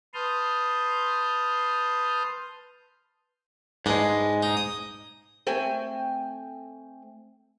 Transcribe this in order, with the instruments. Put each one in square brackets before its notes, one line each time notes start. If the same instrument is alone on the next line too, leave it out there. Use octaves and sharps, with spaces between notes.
[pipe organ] B4 A5 C6 D#6 F6 G6
[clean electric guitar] G#2 G#3 [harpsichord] D4 B4 D#5
[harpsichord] D#4
D#6
[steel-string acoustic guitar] A3 C4 G5 G#5